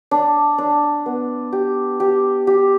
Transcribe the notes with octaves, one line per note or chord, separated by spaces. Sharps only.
D4
D4
B3
G4
G4
G4